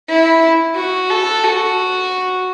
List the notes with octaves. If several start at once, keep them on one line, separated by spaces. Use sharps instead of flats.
E4
F#4
A4
F#4